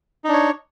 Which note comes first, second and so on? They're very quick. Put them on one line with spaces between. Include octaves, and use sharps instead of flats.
D#4 D4 C#5